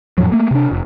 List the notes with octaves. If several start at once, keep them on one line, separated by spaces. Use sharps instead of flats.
F2 A2 F3 F#3
A3 A#3
C3 D4
F1